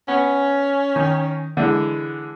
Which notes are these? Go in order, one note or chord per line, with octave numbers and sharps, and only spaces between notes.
B3 C#4
D#3
D3 E3 G#3